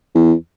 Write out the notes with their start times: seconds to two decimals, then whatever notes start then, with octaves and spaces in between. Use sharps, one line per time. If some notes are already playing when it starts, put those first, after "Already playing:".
0.15 E2